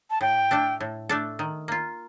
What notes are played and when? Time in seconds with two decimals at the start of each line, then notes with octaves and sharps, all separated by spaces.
0.10 A5
0.21 A2 G5
0.51 A3 D4 A4
0.80 A2
1.09 A3 D4 A4
1.39 D#3
1.68 A#3 F4